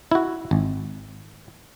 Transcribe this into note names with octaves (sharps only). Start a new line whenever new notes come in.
E4 F#4
G#1